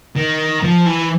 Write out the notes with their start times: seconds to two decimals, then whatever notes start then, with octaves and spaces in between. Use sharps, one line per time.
0.16 D#3
0.63 F3
0.86 E3